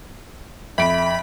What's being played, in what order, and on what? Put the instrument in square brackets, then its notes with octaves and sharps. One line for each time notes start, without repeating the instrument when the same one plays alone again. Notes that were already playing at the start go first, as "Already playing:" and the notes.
[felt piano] F2 D7 [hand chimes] E5 [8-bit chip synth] B5